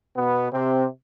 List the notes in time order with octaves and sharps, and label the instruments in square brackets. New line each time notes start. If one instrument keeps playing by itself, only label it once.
[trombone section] B2 B3
C3 C4